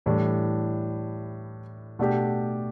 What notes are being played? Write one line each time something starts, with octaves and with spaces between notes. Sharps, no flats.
A2 E3 G3 D4
B2 A3 D4 G4